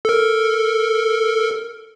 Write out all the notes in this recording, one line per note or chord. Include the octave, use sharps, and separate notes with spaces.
A4 A#4